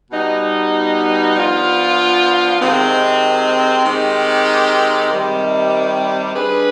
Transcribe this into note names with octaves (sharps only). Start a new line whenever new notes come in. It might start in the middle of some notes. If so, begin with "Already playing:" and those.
B2 G3 B3 D#4
F3 B3 D4 F4
C3 D#3 G#3 C4
D#3 G#3 C4 G4
C3 D#3 G3
G3 D4 G#4 B4